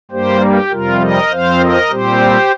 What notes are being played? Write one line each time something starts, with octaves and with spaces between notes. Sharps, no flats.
G2 G3 A#3 G4 C5
G4
F2 C3 G3 F4 A#4
A#4 D#5
F2 F3 C4 C5 F5
A#4 D#5
A#2 G3 C4 G4 C5